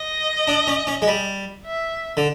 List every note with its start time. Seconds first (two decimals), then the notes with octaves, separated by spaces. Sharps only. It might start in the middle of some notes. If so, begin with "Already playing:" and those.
Already playing: D#5
0.48 D4
0.67 C#4
0.87 C#4
1.02 G#3
1.07 G3
1.66 E5
2.17 D3